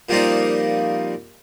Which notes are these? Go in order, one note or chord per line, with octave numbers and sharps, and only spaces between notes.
A#2 F3 G3 A#3 C4 D#4